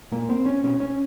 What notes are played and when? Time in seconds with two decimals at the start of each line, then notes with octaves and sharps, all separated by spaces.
0.12 A#2 A#3
0.29 C4
0.46 C#4
0.63 B2 C#4
0.80 C#4